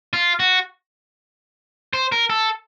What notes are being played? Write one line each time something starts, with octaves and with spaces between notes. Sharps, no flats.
F4
F#4
C5
A#4
A4